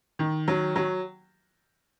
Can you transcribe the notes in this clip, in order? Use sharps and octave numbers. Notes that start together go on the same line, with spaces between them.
D#3
F#3
F#3